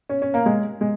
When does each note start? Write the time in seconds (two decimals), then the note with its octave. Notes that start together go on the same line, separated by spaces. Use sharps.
0.09 C#4
0.22 C#4
0.34 A#3
0.46 G#3
0.81 G#3